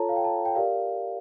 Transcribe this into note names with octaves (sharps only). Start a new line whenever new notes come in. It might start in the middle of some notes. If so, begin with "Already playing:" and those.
Already playing: F4 A4 C#5 A5 A#5
F5
G5
A5
G5
G4 A#4 D5 F5